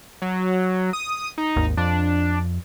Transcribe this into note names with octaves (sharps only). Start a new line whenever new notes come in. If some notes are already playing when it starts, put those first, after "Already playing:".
F#3
D#6
D#4
G#1 D#2
F2 D4